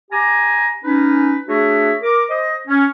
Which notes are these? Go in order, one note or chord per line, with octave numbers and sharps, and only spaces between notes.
G4 G#5 A#5
C#4 D#4 B4
A3 D4 F#4 G#4 C#5 E5
A#4 D6
C5 D#5
C#4